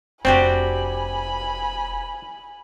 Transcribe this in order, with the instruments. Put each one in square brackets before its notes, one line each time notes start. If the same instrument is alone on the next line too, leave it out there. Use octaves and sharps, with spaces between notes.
[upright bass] F1 [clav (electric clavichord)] C4 [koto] D4 F#4 G4 [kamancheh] G#5 B5